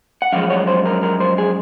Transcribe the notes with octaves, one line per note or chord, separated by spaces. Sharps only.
F#5
F#2 F3 G#3 F5
C#5
C5
A#4
A#4
C5
G#4